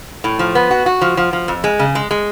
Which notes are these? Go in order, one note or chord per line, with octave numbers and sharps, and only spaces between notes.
A2
F3
B3
F#4
F#4
F3
F3
F3
F2
G#3
C#3
G#3
G#3